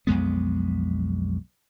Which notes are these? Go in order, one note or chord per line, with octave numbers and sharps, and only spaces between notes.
B1 F2 G#3 B3